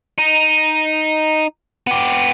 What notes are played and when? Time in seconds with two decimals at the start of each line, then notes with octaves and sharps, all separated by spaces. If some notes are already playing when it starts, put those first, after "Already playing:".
0.18 D#4
1.87 B3 G4